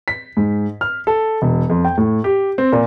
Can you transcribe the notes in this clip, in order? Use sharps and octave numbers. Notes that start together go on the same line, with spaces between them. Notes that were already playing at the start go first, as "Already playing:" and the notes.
B6
G#2
F6
A4
E1
F2
G5
A2
G4
C4
A#2